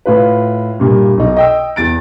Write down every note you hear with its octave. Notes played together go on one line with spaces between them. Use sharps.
A2 F4 B4
G2 A#2
B1 D#4
D#5 G5 E6
E2 A6 D7